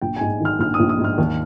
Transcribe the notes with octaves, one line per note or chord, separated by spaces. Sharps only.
A#1 G5
G#2 G#5
D#3 F6
A#1 F6
D#6
A#1
D#6
G#2
F6
D#2